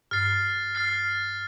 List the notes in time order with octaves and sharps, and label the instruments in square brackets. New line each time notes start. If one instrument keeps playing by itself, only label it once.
[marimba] G2 [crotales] F6 A6 C7
[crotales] F6 A6 C7